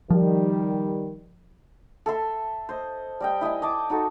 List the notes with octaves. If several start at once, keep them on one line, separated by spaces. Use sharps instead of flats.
D#3 F3 G3
A4 E5 C6
C5 D#5
G3 D#5 G5
E4 D#5 G5 G#5
D#5 A5 D6
D#4 F#4 A4